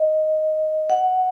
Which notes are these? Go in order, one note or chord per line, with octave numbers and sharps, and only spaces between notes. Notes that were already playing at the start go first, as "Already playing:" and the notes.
Already playing: D#5
F#5